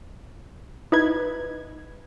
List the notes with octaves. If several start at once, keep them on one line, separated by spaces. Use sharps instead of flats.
D#4 E4 B4 G#6